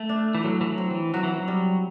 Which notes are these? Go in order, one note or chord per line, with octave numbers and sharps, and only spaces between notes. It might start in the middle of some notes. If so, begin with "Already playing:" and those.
Already playing: A3 A4 E5
D4
E3
A2 F#3
E3
F#3
C4
E3
F#3 F#4
E3
F#3
G3